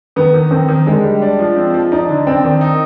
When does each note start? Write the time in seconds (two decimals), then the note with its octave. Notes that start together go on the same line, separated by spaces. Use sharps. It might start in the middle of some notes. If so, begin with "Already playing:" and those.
0.16 D#3 B3
0.34 D#3
0.51 D#3 C4
0.69 D#3
0.86 D3 G#3
1.03 G3
1.22 D4
1.39 F3
1.56 C4
1.74 F3
1.92 D4 D#4
2.09 D3
2.27 C4 D4
2.44 D#3
2.61 D#4